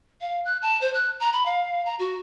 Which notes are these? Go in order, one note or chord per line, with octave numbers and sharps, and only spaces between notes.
F5
F#6
A5
C5
F#6
A#5
B5
F5
A#5
F#4